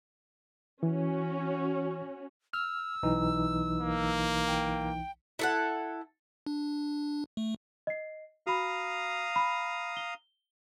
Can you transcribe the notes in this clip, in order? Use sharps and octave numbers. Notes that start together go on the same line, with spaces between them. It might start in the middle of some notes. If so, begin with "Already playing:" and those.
E3 C#4 F#4
E6 F6
B1 E3 D#4
A#3
G5
E4 A4 F#5
D4
A3
D#5 C7
F#4 F5 A#5 B5 D#6
B5
G7